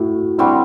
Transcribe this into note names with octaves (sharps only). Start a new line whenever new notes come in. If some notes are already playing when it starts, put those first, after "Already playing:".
Already playing: A2 E4 F#4
D3 G3 C4 E4 F#4